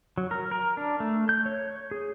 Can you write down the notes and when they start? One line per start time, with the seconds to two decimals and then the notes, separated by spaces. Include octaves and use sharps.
0.18 F#3
0.31 A#4
0.51 A#4
0.77 D4
1.00 A3
1.29 G6
1.46 C#5
1.91 G#4